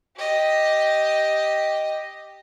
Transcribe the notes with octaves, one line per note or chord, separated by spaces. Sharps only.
G4 D#5